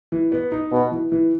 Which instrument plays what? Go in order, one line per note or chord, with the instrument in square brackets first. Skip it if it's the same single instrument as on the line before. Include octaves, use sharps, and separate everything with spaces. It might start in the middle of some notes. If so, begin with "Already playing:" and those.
[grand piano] E3
B3
D#4
[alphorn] B2 [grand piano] B3
[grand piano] E3
E3